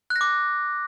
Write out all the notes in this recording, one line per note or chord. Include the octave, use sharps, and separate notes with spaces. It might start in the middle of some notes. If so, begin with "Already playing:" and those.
F#6
A#6
D6